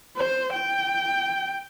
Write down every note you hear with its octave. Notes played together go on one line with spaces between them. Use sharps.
C5
G5